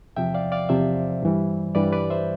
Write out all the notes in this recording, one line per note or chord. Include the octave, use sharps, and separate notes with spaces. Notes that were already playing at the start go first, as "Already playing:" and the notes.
E2 C3 F3 E5 G5
D5 F5
D5 F5
E2 C3 F3 C5 E5
G2 E3 G3
G2 E3 G3 B4 D5
B4 D5
C5 E5